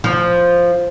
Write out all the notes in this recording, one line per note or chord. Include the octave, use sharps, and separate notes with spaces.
F3